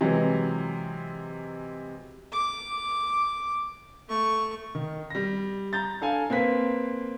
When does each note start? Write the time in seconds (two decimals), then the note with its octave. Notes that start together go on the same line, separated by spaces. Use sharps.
0.01 C3 E3 F#3 G#3
2.32 D6
4.09 A3 C#6
4.75 D#3
5.10 G3 A#6
5.73 A#5 G6 A6
6.01 D4 A4 F5 G#5
6.30 A#3 C4 B4 B6